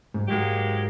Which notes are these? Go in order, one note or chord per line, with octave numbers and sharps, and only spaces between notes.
G#2
G#2 F#3 G#3 A#3 G4